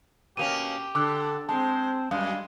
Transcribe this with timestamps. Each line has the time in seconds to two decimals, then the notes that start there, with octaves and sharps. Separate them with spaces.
0.37 B2 A#3 C#4 G4 D#7 F7
0.95 D3 A4 D6 E6 F#6
1.49 G#3 C4 C5 A5
2.11 F#2 G3 G#3 F5